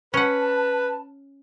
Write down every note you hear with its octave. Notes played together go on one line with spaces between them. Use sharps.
C#4 B4 F#5 A5